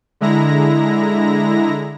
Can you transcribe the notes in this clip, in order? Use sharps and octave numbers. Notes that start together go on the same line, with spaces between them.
D3 G#3 E4 A#5 A#6